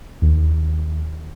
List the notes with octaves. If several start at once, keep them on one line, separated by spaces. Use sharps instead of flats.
D#2